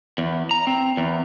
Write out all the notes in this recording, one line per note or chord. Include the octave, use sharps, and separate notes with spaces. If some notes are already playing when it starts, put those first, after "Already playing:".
E2
A#5
C4
E2